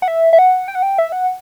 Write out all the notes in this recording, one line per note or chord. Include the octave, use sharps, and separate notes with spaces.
F#5
E5
E5
F#5
G5
F#5
G5
E5
F#5